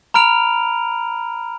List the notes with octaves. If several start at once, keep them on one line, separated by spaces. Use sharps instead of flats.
A#5 B5 F6 D7 F7